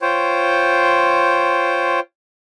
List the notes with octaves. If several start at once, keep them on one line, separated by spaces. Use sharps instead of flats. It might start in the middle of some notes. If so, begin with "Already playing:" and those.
F4 C5 C#5 G5